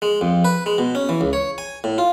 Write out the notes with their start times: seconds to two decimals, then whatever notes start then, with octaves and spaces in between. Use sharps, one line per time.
0.02 G#3
0.21 F2
0.45 B4
0.66 G#3
0.78 B2
0.95 C#4
1.09 E3
1.21 C#2
1.33 C#5
1.58 G#5
1.84 A2
1.98 F4